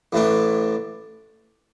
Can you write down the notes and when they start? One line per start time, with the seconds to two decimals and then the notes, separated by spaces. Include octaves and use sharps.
0.12 A1 A2 E3 A3 D4